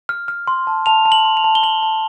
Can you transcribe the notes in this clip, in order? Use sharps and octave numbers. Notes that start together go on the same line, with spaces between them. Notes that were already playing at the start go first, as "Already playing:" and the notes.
F6
F6
C6
A5
A5 F7
A5
F#7
C6
F7
A5
G7
A5 F#7
A5